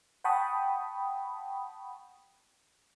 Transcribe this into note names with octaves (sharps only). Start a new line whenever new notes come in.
F#5 G5 A5 B5 C#6 D#6